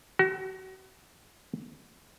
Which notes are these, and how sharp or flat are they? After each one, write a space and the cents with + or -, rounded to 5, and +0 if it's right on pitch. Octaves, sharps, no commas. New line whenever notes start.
F#4 +35